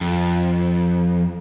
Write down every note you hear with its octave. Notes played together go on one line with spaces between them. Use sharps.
F2